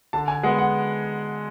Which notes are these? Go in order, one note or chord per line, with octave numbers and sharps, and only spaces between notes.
D3 A5
G#5
G#3 B3 F#5
F#5